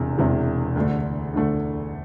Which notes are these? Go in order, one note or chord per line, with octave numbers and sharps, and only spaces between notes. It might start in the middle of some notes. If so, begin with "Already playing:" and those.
Already playing: E1 E2 C3
E1 E2 C3
D2 D3 A3
D2 D3 A3